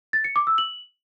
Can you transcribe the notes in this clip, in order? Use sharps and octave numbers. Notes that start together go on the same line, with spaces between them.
A6
C#7
D6
E6
F#7